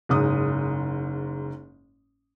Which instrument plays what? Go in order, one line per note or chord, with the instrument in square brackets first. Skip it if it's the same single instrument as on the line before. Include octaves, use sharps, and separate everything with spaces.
[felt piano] F#1 G#2 D#6